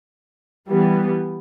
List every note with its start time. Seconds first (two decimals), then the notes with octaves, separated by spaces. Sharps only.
0.68 E3 G3 B3